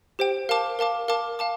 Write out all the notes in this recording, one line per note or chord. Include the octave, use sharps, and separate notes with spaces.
G4 C5 G5
A#4 F5 A5 D6
A#4 F5 A5 D6
A#4 F5 A5 D6
F5 A5 D6